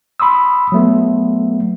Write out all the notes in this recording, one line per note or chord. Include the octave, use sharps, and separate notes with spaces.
B5 C6 D#6 E6
F#3 A3 B3